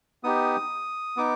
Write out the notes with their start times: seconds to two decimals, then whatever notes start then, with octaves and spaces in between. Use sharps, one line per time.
0.24 B3 D#4 G4 D#6
1.17 B3 D#4 D6